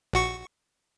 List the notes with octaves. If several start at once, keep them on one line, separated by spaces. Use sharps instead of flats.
A#1 F#4 C#6